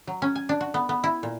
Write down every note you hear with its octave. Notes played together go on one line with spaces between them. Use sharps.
F#3
C#4
G#5
D4
F#4
B3
B3
E4
A#2